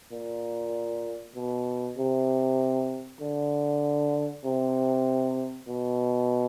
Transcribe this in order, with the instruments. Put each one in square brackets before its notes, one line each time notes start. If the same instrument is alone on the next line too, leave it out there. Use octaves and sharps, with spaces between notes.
[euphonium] A#2
B2
C3
D3
C3
B2